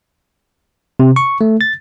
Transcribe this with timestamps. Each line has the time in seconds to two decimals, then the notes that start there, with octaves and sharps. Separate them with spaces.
1.00 C3
1.16 C#6
1.41 A3
1.61 A6